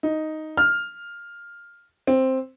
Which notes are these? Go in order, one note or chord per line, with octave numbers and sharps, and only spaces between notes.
D#4
F6
C4